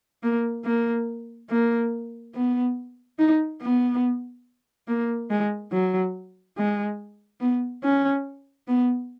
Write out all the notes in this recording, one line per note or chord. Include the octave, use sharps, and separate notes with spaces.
A#3
A#3
A#3
B3
D#4
B3
A#3
G#3
F#3
G#3
B3
C#4
B3